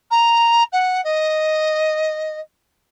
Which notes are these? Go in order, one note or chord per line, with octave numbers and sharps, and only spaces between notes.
A#5
F#5
D#5